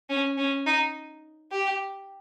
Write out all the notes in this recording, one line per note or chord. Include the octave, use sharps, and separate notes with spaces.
C#4
C#4
D#4
G4